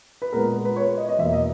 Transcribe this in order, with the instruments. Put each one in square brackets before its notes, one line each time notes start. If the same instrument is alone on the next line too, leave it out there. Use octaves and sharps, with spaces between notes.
[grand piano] B4
A#2 G#3 B3 A#4
B4
C#5
D#5
D#5
E2 B2 A#3 E5
D#5